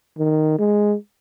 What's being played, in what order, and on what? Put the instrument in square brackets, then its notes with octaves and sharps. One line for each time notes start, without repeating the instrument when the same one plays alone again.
[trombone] D#3
G#3